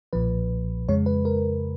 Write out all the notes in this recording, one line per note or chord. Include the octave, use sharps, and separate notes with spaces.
B1 A#2 F3 B4
F2 C#3 G#3 C#5
B4
A#4